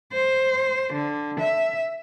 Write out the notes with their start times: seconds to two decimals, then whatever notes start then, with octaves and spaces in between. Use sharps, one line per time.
0.12 C5
0.93 D3
1.39 E5